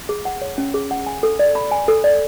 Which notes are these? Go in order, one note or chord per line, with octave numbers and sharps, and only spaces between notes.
G#4
F#5
C#5
C#4
G#4
F#5
G#5
A4
D5
B5
G#5
A4
D5